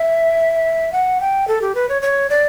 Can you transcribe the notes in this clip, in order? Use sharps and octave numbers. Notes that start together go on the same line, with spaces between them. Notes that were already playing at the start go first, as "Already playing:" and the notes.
Already playing: E5
F#5
G5
A4
G4
B4
C#5
C#5
D5